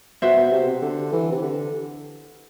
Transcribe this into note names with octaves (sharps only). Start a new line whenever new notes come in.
B2 F#4 C5 E5
B2
C3
C3
D3
E3
C3
D3